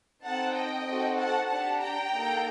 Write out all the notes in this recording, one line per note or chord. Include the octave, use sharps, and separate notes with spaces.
C4 D#4 A4 F#5 A5
D#5 G5
C4 D#4 F#4 A4
F#5 A5
D4 G4 F#5 A5
G5 A#5
A#3 D#4 A4